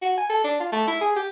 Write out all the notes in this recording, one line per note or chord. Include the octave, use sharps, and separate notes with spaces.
F#4
G#5
A4
D4
F4
A3
E4
G#4
G4